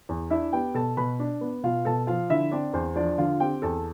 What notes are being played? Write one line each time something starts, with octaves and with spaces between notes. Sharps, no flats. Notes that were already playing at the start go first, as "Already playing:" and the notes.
E2
D4 E4 E5
B3 G4 G5
B2 A4 A5
B2 B4 B5
D4
B3
B2 F4 F5
B2 A4 A5
F3 F4 F5
D3 E4 E5
C4 D4 D5
E2 C5
F3 D4 D5
D3 F4 F5
C4 G4 G5
E2 A4 A5